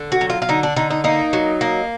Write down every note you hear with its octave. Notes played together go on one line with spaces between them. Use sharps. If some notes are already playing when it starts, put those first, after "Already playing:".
Already playing: D3
F#4
F#3
F4
F4
D3 D#4
D4
D3 D#4
D#4
A#3 D#4
F#3
A#3